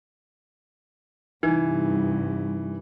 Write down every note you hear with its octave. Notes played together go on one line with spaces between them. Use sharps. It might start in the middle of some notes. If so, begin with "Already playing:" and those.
C2 G2 E3 D#4